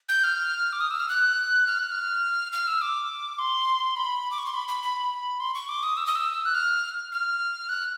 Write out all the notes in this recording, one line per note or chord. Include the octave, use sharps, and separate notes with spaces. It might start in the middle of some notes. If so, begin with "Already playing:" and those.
G6
F6
D6
D#6
E6
F6
F#6
F6
F#6
F6
F6
E6
D6
C6
B5
D6
C#6
C6
B5
B5
B5
C6
C#6
D6
D#6
E6
D#6
E6
F#6
F6
F6
F#6